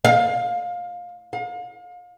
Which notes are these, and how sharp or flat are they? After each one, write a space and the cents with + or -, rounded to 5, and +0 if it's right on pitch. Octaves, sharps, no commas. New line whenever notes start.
F5 +20
F5 +35